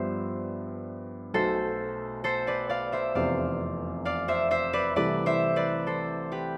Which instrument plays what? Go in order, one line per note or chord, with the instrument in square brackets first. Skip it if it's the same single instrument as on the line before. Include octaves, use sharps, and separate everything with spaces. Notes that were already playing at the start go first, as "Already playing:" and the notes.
Already playing: [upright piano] G2 F3 B3 D4 G4 [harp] C5 E5
[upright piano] B1 B2 A3 [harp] A4 C5
[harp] A4 C5
B4 D5
D5 F5
C5 E5
[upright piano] F1 E2 C3 [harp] D5 F5
[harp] D5 F5
C5 E5
C5 E5
B4 D5
[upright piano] C2 C3 E3 A3 [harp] B4 D5
[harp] C5 E5
B4 D5
A4 C5
G4 B4